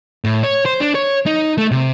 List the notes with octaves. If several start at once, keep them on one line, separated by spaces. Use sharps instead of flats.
A2
C#5
C5
D4
C#5
D#4
A3
C3